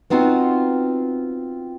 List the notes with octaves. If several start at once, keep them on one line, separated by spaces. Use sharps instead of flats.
B3 C4 D#4 F4 F#4